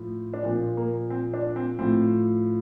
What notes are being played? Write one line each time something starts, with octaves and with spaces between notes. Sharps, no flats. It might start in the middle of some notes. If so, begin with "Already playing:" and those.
Already playing: A2 F3
D4
A#2 F3 C4
A#3
C4
D4
C4
A2 F3 C4